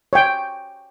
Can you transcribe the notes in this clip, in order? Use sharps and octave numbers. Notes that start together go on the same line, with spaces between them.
C#5 G5